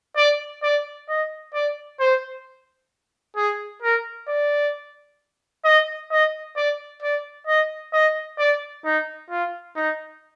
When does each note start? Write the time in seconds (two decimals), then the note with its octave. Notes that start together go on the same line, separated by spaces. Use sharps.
0.17 D5
0.63 D5
1.09 D#5
1.54 D5
2.00 C5
3.37 G#4
3.82 A#4
4.28 D5
5.65 D#5
6.11 D#5
6.56 D5
7.02 D5
7.47 D#5
7.93 D#5
8.39 D5
8.85 D#4
9.30 F4
9.76 D#4